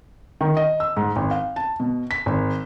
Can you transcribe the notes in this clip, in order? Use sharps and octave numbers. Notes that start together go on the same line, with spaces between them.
D#3
D#5
E6
G#2
G#1
F5
A5
B2
B6
G#1